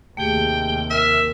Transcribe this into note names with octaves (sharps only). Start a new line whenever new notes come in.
D#2 C3 A3 G4 G#4 G5
A#4 E5 F6